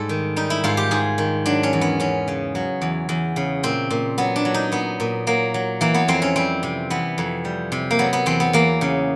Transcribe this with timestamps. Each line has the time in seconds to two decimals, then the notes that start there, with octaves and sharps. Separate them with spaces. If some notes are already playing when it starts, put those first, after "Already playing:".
Already playing: G#2 G3 A4
0.09 D#3
0.36 G3 D#4
0.50 E4
0.64 G#2 F4
0.77 G4
0.91 G#2 G#4
1.18 D#3
1.46 F#3 D4
1.63 C#4
1.73 E2
1.81 B3
2.00 E2 C#4
2.28 C#3
2.55 F#3
2.82 E2
3.09 E2
3.36 C#3
3.63 A#2 C4
3.90 A#2
4.18 F#3 B3
4.36 D4
4.45 F#3
4.54 D#4
4.72 A#2 B3
5.00 A#2
5.27 F#3 A#3
5.54 F#3
5.81 E3 A#3
5.94 B3
6.08 F2 C4
6.22 C#4
6.36 G3 C4
6.63 C3
6.90 E3 B3
7.18 F2
7.45 G3
7.72 C3
7.91 A#3
7.99 F#3 B3
8.13 B3
8.26 E2 C4
8.40 B3
8.53 E2 A#3
8.81 C#3